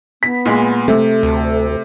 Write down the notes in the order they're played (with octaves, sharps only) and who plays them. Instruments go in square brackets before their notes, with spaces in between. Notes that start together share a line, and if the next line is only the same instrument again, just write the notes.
[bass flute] B3 [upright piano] B6
[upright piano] A#2 G#3
[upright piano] C3 [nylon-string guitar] A3
[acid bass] D2 [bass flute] A4